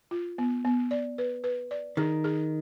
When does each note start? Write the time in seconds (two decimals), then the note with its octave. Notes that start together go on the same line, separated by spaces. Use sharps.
0.11 F4
0.38 B3
0.65 B3
0.91 D5
1.18 B4
1.44 B4
1.71 D5
1.97 D#3 G#4
2.24 G#4